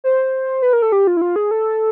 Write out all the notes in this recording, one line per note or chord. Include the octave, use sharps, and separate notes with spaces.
C5
B4
A#4
A4
G4
F4
E4
F4
G#4
A4